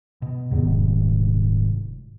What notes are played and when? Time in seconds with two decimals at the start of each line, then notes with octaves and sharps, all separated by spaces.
0.22 B2
0.51 E2 G#2 C3 D#3
0.64 D#1